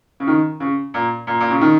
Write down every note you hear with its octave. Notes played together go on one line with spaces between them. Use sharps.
C#3
D#3
C#3
A#2
A#2
A#2
C#3
D#3